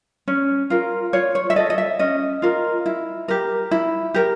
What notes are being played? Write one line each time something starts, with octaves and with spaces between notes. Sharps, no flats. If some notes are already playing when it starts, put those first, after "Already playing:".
C#4
F4 A#4
F4 C#5
C#5
E5
A4 D#5
D#5
E5
C#4 D#5
F4 A#4
E4
G4 A#4
E4
G4 A#4